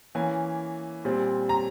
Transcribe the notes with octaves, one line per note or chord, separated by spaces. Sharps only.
E3 A#3 C#4 G#5
A#2 G3 C4
A#5